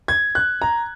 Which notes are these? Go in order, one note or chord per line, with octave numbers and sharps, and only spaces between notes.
G#6
F#6
A#5